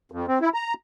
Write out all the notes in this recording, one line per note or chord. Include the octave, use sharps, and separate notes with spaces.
F2
C4
E4
A#5